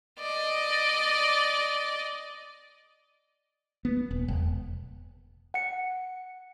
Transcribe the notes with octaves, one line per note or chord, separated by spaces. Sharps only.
D5 D#5
B3
D#1
E1
F#5 C#7